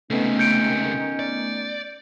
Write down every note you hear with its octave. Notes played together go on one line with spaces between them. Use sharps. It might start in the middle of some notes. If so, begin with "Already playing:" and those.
C#2 C3 D#3 A3 B3 C#4
G6 C#7 D7
D5